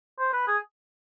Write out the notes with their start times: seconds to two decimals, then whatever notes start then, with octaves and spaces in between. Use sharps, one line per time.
0.19 C5
0.33 B4
0.48 G#4